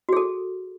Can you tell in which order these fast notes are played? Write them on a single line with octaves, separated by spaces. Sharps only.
F#4 G#4 A4